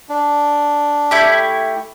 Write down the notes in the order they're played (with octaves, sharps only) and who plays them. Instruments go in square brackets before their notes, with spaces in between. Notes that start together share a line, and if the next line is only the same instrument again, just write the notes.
[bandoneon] D4
[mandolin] A3 E4 G4